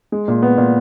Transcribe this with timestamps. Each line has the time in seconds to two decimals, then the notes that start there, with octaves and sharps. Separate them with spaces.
0.12 G#3
0.28 A#2
0.42 B3
0.58 A#2